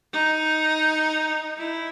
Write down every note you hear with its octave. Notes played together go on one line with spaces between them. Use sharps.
D#4
E4